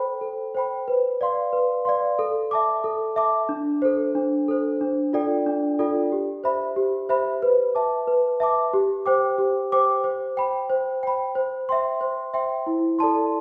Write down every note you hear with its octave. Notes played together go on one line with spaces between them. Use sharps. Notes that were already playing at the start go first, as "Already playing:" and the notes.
Already playing: A4 C5 G5 B5
A4
C5 G5 B5
B4
D5 F5 C6
B4
D5 F5 C6
A4
E5 A5 D6
A4
E5 A5 D6
D4
A4 C5
D4
A4 C5
D4
F4 A4 D5 G5
D4
F4 A4 D5 G5
G4
C5 E5 B5
G4
C5 E5 B5
B4
E5 A5 D6
B4
E5 A5 D6
G4
C5 G5 D6
G4
C5 G5 D6
C5
G5 B5
C5
G5 B5
C5
E5 G5 C6
C5
E5 G5 C6
E4
A4 D5 A5 C6